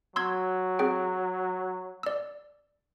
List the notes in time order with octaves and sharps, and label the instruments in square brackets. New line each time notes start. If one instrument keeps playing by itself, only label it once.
[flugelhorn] F#3 [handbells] C6 E6 G#6
[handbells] C4 G#4 G5
D5 E6